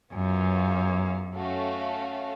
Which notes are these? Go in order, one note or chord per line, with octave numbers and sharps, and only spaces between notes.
F#2 B3 F4 G#4 C#5 F5
A3 C#4 F#4 A4 F5